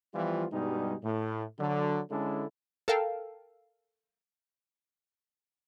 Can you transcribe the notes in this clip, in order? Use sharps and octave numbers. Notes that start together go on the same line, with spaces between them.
E3 F3 G3 B3 F4
G2 B2 G3 G#3 D#4
A2
D3 F#3
D3 G#3 C#4 D4 E4 A4
A4 A#4 F5 G5 A5